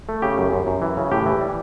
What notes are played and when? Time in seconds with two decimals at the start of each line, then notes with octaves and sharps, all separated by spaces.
0.09 A3
0.22 C#3 G4
0.38 F#2
0.52 F#2
0.67 F#2
0.82 E3
0.97 C#3
1.12 A2 G4
1.26 E3
1.41 G3